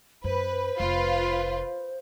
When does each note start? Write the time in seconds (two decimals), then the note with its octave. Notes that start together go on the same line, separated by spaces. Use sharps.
0.24 F#2 B4 C5
0.80 F1 F4 B4